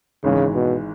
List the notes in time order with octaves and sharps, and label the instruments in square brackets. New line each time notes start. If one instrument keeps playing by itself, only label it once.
[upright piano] G#1 G#2 E3 [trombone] C#3
[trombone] B2